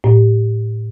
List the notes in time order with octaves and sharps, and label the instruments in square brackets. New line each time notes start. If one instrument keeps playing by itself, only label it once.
[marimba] A2